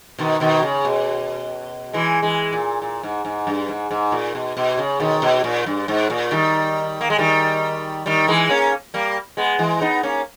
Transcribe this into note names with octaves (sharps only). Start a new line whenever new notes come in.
B2 D#3
B2 D#3
C#3
B2
E3 G#3
E3 G#3
A#2
A#2
G#2
G#2
G2
G#2
G#2
A#2
B2
B2
C#3
B2 D#3
B2
A#2
G2
G#2
A#2
D#3 G3
A#3
G#3
D#3 G3
D#3 G3
E3 G#3
A#3 C#4
G3 A#3
G#3 B3
E3 G#3
B3 D#4
A#3 C#4